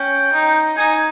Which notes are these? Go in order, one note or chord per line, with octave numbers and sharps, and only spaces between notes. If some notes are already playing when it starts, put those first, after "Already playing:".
Already playing: C#4 G5
D#4
D#4 G#5